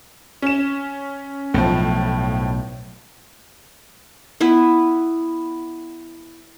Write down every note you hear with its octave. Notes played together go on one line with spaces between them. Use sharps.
C#4 E7
B1 A2 F3
B3 E4 B4